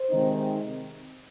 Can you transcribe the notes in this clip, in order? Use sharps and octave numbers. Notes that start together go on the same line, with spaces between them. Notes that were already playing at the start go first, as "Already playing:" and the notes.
Already playing: C5
C3 D#3 G#3 C4 D#4